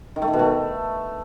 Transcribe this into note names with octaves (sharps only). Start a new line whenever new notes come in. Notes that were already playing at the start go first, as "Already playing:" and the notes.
D#3
A3
D#3
B2
A3